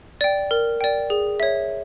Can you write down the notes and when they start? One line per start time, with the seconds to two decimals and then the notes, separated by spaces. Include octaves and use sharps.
0.21 D5 G5
0.51 A#4
0.81 D5 G5
1.10 G#4
1.40 C#5 E5